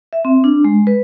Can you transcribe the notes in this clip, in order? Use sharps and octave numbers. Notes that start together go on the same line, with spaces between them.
E5
C4
D4
G#3
B4